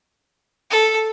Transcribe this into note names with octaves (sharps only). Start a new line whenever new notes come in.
A4